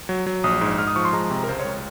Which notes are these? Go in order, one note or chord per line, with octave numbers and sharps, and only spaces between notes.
F#3
F#3
A#1 D#6
G#2
G#2 F6
D#6
F3 C#6
C6
G#3 A#5
A#5
C3
A#5
A#4
C#2 C5
C#5
C#2